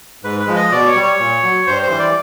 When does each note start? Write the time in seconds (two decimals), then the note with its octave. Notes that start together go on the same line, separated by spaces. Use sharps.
0.23 G#2 B4
0.40 B4
0.47 F3 G#3
0.56 D#5
0.72 B2 D5
0.87 C#5
0.96 G3
1.03 C#5
1.20 A#2
1.43 F#3
1.67 G2 C5
1.83 C5
1.90 E3 G3
1.99 D5